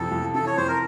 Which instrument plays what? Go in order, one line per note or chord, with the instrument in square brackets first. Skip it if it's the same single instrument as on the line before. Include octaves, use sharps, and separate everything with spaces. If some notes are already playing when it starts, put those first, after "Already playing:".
Already playing: [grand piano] F2 C3 E3 [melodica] A4
[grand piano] F2
[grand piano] E3 [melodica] A4
[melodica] C#5
[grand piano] F2 [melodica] C5
[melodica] A#4